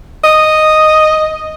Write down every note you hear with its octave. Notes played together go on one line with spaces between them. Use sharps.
D#5